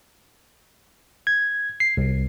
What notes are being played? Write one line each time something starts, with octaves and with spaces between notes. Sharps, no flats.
G#6
C7
C2